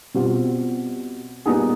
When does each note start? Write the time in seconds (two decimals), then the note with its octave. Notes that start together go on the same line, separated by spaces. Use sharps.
0.14 B2 G3 C4 F4
1.46 A#2 G3 B3 D#4 G#4